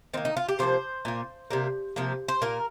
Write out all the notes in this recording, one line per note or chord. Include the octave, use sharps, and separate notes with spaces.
D#3 A#3 C4
D#4
F4
G4
C3 F3 A#3 C5
A#2 A#3
C3 G3 A#3
C3 F3 A#3
C5
A#2 A#3 A#4